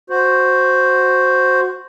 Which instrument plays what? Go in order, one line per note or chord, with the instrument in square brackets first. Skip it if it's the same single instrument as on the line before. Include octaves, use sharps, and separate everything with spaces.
[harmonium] F#4 C5